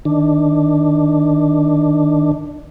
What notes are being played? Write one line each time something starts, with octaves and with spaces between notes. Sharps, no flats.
D#3 D4